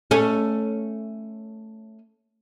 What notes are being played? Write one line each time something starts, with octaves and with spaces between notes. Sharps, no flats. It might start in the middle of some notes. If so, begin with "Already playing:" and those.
A3 C#4